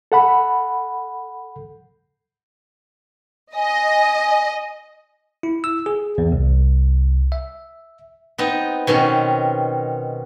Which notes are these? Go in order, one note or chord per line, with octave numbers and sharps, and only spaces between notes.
A4 F#5 B5
D#5 G#5
E4
E6
G#4
E2
C2
E5
B3 C4 D#4
B2 D#3 C4 C#4